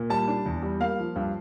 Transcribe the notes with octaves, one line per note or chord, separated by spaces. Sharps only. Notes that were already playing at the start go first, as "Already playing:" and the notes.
Already playing: A#2
G3 A5
D4
E2
G3
A#3 F5
F3
G2